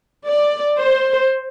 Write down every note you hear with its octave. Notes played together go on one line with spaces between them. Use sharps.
D5
C5